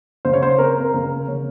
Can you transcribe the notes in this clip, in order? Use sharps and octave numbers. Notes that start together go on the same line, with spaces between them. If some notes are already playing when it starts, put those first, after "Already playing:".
C#3 C5
C#5
C5
C4 A#4
A#4
C#3 A#4
C#3 C#5